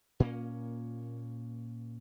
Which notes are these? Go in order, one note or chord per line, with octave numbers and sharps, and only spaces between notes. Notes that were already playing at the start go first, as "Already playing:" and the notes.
A#2 A#3 C#4